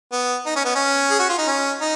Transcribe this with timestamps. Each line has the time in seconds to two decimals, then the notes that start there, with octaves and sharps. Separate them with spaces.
0.12 B3
0.46 D#4
0.56 C#4
0.65 B3
0.75 C#4
1.10 G#4
1.19 F#4
1.29 F4
1.38 D#4
1.47 C#4
1.81 D#4